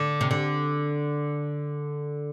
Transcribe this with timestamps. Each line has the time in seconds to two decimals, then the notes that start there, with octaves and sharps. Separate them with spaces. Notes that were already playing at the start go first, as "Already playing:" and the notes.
Already playing: D3
0.21 C3
0.31 D3